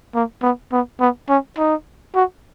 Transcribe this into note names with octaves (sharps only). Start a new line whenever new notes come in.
A#3
B3
B3
B3
C#4
D#4
F#4